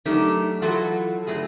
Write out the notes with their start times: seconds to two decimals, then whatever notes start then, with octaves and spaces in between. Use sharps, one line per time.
0.05 F#3 A3 D4 D#4 G4 A#4
0.62 E3 F#3 F4 F#4 A4 B4
1.27 G2 F#3 A3 G#4